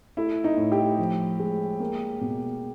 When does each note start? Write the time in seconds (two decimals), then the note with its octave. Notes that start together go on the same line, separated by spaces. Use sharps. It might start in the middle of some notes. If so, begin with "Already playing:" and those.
0.17 A3 E4
0.44 D#4
0.57 A2
0.72 G4
0.99 F3
1.40 G#3
1.80 A#3
2.21 B2